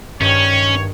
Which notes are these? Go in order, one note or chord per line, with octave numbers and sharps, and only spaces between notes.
G2 D#3 C#4 C#5